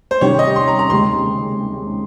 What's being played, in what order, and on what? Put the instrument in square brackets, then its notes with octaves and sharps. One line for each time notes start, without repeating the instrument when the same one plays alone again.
[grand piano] C5
[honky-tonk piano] C3 D#3 G3 C#4 G4 [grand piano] C#5
[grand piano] D#5
C6
A#5
A#5
[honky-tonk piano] D#2 C#3 G#3 C4 G4 [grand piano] C6